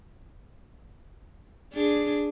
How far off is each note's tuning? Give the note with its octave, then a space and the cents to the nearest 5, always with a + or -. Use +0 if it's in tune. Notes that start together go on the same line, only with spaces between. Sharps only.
D4 +0 G#4 +0